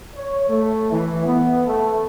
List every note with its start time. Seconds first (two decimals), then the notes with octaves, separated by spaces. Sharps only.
0.15 C#5
0.49 A3
0.91 E3
1.26 B3
1.66 A3